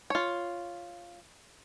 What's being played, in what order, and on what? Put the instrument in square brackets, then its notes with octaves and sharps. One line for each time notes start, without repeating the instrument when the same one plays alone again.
[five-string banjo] F4 C#5